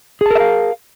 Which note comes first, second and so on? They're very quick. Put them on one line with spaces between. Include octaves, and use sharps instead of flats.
G#4 A5 A#4 E5 F5